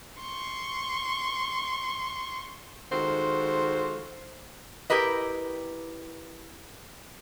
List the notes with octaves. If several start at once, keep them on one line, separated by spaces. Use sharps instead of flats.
C6 C#6
D#3 G#3 F4 F#4 A4 C5
E4 G4 A#4 B4 D#5